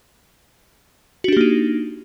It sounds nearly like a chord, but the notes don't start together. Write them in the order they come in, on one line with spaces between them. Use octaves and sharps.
F#4 D4 G4 A#3 D#4